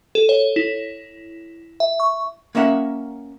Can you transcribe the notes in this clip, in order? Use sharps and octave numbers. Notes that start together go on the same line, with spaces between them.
A4
C#5
E4
E5
C#6
A#3 C#4 A#4 E5 F#5